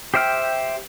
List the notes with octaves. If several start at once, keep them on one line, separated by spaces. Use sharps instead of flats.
G4 C5 E5 G5 F6